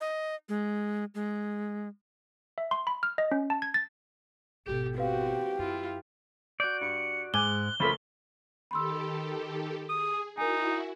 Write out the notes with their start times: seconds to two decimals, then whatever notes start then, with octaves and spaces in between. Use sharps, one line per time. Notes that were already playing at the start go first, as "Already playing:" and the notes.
0.01 D#5
0.49 G#3
1.15 G#3
2.58 E5
2.71 C6
2.87 B5
3.03 F6
3.18 D#5
3.31 C#4
3.50 A5
3.62 G#6
3.74 A6
4.66 G#1 B2 G4 A4
4.98 C4 F#4 G4 B4 F5
5.59 F#2 E4 F4
6.60 F#4 D5 G6
6.81 G2 C#7
7.34 G#2 G#3 G#5 D6 F#6 G7
7.80 C#2 F3 A3 F4 A#4 E5 B5
8.71 D#3 G4 A4 B5 C6 E6
9.89 G#4 D#6
10.37 D#4 E4 F#4 A#4 G#5